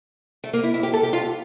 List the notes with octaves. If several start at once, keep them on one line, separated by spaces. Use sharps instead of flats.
A3
A#3
E4
E4
G4
A4
G4
F4